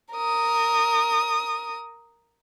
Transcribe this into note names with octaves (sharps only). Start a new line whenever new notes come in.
A#4 D#6